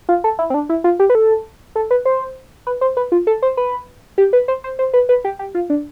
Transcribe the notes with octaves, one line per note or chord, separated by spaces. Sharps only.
F4
A4
E4
C4
D4
E4
F4
G4
B4
A4
A4
B4
C5
B4
C5
B4
F4
A4
C5
B4
G4
B4
C5
C5
C5
B4
B4
G4
G4
F4
D4